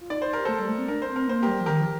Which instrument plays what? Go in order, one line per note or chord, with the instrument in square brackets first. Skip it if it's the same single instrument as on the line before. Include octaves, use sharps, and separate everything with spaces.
[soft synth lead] F4
[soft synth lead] D#4 [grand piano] D5
[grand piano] C5
[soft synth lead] G4 [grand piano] A#4
[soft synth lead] A3 [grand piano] A4 C5
[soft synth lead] G3
A3
C4
[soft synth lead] D4 [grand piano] A#4
[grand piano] C5
[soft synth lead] C4
[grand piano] A#4
[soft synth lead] A#3 [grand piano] C5
[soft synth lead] G3 [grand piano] G4 A#4
[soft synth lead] F3
[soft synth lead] D#3 [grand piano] G4 A#4
[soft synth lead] F3